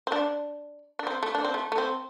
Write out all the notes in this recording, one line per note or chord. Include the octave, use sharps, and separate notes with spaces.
C4
D4
D4
C4
A3
D4
C4
A3
A3
C4